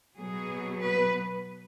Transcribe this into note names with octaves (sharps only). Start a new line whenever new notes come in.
B2 F#3 B3 G#4
B4